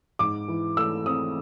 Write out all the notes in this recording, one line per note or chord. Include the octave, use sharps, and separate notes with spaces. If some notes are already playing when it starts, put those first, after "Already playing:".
G#2 D6
E3
A3 E6
C4 D#6